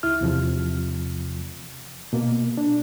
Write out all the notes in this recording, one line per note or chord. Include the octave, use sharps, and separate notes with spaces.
C#2 E4 F6
E2 C3 F3
B2 A#3
D4